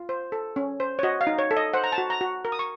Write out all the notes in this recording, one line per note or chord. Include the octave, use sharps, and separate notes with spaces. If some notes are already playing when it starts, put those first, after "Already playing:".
Already playing: F4
C5
A4
C#4
C5
C#5
F#4 D#5
F5
D#4
C#5
A4
D#5
C5 F#5
A#5
A5
F#4
A#5
F#4
A#4
D#6
C#6